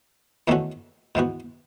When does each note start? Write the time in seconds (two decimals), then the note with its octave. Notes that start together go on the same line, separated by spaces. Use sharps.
0.48 E2 D#3 A3 C#4 F#4
1.15 G#2 E3 B3 F#4